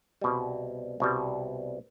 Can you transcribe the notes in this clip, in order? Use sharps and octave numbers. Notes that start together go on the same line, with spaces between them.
C2 B2 G3
C2 B2 G3